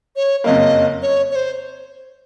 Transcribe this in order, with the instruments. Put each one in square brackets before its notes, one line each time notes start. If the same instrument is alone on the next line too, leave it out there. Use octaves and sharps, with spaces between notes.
[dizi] C#5
[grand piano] F#1 F2 C#3 F#3 A#3 [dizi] D#5
[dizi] C#5
C#5
C5